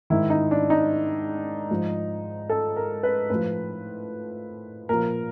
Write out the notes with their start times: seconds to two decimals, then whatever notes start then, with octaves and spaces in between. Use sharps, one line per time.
0.10 G#2 D#3 E4
0.30 D#4
0.51 D4
0.70 D#4
1.70 G#2 F3
2.49 A4
2.77 A#4
3.03 B4
3.30 A2 F3 B4
4.89 A#2 F3 A#4